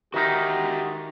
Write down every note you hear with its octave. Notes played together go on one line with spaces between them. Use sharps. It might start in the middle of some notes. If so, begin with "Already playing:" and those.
D#3 D#4 F#4 G4 E5 F#5